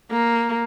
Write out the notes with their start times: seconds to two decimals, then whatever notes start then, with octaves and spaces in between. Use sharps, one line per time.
0.11 A#3